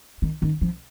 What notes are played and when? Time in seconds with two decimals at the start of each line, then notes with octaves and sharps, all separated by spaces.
0.22 D#3
0.42 D#3
0.61 F3